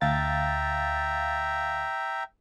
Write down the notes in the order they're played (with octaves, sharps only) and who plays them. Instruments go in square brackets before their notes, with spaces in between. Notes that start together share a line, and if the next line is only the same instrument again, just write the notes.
[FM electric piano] D2 F5 A6 [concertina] E5 G5 A#5